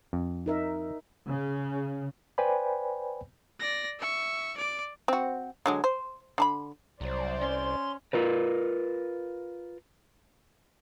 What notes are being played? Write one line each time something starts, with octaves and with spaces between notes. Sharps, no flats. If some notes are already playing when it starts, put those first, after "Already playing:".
F2
D#4 A#4 E5
C#3
B4 C5 D5 G5 G#5 B5
D5 A#6
E5 C#6
D5 D6
C4 F#4
D3 F#3 G#3
C5
D3 A5 B5
C2 F#3 C5 D5
C#4 C6
F4 A#4 B4